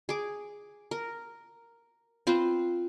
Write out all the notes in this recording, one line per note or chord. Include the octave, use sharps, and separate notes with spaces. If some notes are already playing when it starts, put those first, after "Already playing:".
G#4 D6
A#4
C4 F4 B4 C5